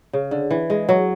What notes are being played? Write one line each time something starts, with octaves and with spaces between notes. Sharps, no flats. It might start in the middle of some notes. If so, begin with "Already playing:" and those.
C#3
D3
E3
G#3
F#3